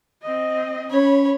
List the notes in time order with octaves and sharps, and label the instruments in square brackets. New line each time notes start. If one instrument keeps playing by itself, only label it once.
[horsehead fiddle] C4 D#5
[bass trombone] C#4 [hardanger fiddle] C#5 [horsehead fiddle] B5